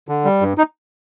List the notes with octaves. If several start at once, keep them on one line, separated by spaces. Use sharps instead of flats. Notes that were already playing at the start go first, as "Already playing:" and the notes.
D3
G3
G2
D#4